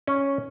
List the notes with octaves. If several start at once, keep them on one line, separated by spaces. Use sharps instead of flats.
C#4